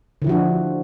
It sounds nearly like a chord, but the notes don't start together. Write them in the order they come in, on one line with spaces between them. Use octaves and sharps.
D3 E4 F3 F#4 D4